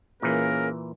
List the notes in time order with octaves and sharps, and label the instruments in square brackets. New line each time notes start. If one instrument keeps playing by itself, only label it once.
[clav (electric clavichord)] A#2 E3 [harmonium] A#3 C#4 G#4 [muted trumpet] A#4